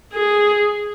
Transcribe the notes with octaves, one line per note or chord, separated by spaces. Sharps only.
G#4